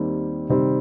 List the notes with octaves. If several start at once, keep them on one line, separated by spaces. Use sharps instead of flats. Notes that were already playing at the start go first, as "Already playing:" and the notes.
Already playing: D#2 D#3 G3 C4
C3 D#3 G3 C4